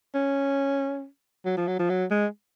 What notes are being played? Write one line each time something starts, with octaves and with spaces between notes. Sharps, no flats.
C#4
F#3
F3
F#3
F3
F#3
G#3